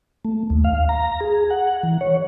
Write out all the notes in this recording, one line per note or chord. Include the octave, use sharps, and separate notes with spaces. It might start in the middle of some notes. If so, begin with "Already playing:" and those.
A3
D#2
F5
A#5
G#4
F#5
E3
C#5